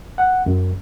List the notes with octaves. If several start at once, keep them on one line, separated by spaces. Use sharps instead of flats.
F#5
F#2